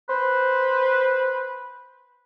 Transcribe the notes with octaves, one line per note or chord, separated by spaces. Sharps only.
B4 C5